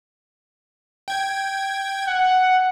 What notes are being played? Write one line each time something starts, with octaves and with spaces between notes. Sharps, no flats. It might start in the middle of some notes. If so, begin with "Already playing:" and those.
G5 G#6
F#5